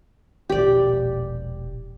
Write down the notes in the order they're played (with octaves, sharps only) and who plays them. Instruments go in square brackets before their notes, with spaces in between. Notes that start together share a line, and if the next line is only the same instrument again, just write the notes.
[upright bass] E1 A#1 [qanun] G4 D5